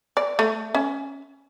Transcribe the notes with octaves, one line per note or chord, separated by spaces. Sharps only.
D5
A3
C#4